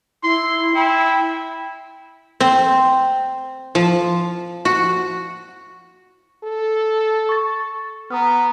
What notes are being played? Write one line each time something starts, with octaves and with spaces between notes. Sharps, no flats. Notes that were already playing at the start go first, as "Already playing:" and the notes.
E4 C6
E4 G5
C4
F3
F#4
A4
C#6 A6
B3 A#5 D#6 F6